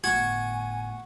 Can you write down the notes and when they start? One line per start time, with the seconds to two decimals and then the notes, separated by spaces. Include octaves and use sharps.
0.04 G1 A2 F#4 G#5 C#6 G#6